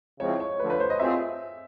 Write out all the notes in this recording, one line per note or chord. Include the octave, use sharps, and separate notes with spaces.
C#3 F3 G#3 C4 E4 C#5
C#5
D3 F3 A3 B4
B4
C5
D#5
A3 C4 F4 G#4 E5